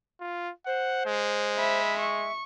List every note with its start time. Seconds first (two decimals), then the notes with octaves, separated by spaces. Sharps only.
0.21 F4
0.66 C5 F#5
1.06 G#3
1.57 E5 B5
2.00 E5 C#6